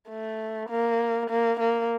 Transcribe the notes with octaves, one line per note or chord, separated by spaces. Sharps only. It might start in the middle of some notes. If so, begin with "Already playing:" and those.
A3
A#3
A#3
A#3